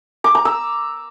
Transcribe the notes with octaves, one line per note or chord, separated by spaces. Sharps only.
D6
A#5
E6